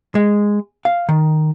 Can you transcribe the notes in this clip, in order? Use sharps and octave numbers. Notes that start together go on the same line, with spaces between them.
G#3
F5
D#3